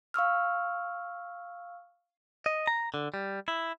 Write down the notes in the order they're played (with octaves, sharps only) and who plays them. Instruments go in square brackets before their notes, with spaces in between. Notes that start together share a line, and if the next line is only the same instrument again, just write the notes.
[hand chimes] F5 C#6 E6 F6
[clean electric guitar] D#5
A#5
D3
G3
E4